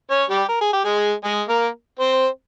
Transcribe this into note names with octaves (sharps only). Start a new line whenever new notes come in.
C#4 C#5
G3 G4
A#4
G#4
G4
G#3 G#4
G#3 G#4
A#3 A#4
C4 C5